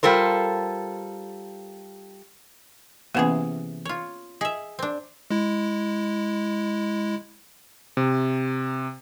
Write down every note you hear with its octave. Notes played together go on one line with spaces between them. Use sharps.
G3 F4 A4 A#4 C5
C3 E3 A#3 B3 C#4 G#4
F4 C#5
G#4 D#5 E5
C4 D4
G#3 E4
C3